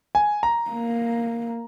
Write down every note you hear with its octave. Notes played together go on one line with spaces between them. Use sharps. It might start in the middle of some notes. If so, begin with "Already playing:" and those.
G#5
A#5
A#3